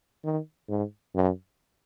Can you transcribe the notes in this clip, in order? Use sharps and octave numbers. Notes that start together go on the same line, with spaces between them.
D#3
G#2
F#2